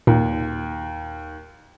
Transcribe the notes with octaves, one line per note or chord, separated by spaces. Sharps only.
D#2 A#2